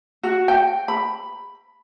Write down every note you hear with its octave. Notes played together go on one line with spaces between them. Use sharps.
F#4
G5
B5